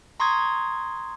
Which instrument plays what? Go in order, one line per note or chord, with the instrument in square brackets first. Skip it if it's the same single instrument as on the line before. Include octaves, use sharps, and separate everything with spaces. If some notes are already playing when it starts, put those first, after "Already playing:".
[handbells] A#5 C6 C#6 D#6 G#6